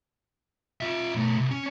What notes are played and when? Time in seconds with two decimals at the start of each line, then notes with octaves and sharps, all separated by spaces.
0.81 F4 E5
1.15 B2 A3
1.38 C2
1.51 C#4